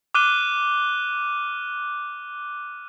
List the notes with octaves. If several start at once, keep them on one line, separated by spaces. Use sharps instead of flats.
D6 F6 F#6 D#7 G7